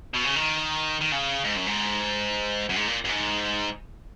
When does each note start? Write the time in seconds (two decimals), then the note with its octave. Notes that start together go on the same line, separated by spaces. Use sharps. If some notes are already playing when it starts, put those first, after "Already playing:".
0.14 B2
0.25 C#3
0.36 D#3
1.01 D#3
1.12 C#3
1.45 G#2
1.56 F#2
1.67 G#2
2.69 F#2
2.76 G#2
2.88 A#2
3.05 F#2
3.09 G#2